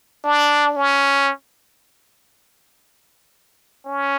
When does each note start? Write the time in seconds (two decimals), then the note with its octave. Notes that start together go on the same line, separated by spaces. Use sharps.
0.24 D4
0.76 C#4
3.86 C#4